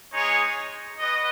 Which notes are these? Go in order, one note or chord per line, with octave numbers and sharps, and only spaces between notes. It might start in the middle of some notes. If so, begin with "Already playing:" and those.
G#3 D#4 G#4 C#5
F#4 B4 D#5